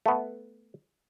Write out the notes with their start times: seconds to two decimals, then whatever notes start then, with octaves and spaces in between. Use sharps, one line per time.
0.06 A3 B3